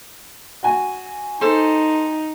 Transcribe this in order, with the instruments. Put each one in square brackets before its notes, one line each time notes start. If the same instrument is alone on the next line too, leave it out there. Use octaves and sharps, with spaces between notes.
[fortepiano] F#4 G#5
[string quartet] D#4 [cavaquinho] A4 C5